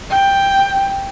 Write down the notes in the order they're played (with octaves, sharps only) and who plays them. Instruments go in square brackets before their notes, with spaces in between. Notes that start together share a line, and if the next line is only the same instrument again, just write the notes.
[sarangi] G5